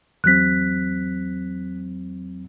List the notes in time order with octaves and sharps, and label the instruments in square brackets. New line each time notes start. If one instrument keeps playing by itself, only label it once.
[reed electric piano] E2 F#3 C4 [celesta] F#6 B6